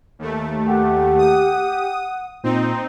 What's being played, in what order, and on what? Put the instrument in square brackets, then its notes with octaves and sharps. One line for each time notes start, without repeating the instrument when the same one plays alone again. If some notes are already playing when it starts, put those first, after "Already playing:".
[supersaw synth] D#2 A3
[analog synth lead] G4 [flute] F#5
[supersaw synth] D#6
[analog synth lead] A#2 [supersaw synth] C4 D#4